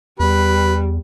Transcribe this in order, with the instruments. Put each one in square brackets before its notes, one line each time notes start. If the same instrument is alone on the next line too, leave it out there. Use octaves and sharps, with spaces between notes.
[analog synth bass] E2 [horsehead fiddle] G3 [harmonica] B4